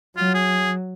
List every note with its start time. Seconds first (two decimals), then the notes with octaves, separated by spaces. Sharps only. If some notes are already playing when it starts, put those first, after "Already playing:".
0.17 F#3 F4
0.34 G#4